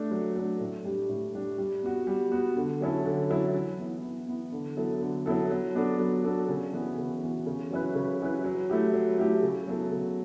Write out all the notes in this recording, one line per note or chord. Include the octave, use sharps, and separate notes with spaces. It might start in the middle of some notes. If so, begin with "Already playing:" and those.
Already playing: A3 D4
F#3
A3 D4
A2
G3 D4 G4
A2
G3 D4 G4
G3
B3 F#4
G3
B3 F#4
D3
F#3 C#4 E4 A4
D3
F#3 C#4 E4 A4
E3
B3 E4
E3
B3 E4
D3
F#3 B3 E4 A4
D3
F#3 B3 E4 A4
F#3
B3 D4 F#4 A4
F#3
B3 D4 F#4 A4
C#3
E3 B3 F#4
C#3
E3 B3 F#4
C#3
F#3 C#4 E4 B4
C#3
F#3 C#4 E4 B4
F#3
A3 E4 G4
F#3
A3 E4 G4
C#3
F#3 B3 E4 A4
C#3